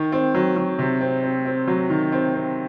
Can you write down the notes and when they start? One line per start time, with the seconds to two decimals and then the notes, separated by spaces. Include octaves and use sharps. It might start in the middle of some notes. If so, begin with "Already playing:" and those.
Already playing: D#3
0.12 C4
0.35 F#3
0.56 F#3
0.79 C3
1.01 C4
1.24 C4
1.46 C4
1.67 F#3
1.90 D#3
2.12 C4
2.34 C4